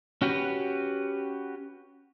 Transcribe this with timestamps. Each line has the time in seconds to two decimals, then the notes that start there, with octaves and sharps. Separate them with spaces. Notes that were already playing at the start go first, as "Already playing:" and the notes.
0.22 C#4 F#4 G4 B4